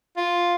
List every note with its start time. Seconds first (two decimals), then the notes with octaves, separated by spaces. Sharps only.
0.17 F4